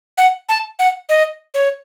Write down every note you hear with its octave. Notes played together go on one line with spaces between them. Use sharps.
F#5
A5
F#5
D#5
C#5